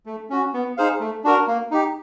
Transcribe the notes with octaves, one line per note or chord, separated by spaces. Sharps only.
A3
C#4 F#4
B3
D#4 G#4 C5 F5
A3
D4 F#4 A#4
A#3
D#4 G4